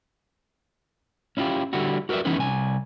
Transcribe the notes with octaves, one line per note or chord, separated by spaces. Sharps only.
C#4 E4 F4 G4
D3 G3 E4 F#4
F#4 A#4 B4 D5 E5
E3 B3 C#4 D#4 E4 B4
C2 G#5